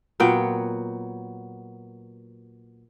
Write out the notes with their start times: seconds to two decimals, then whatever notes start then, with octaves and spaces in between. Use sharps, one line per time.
0.20 A#2 F#3 B3 G5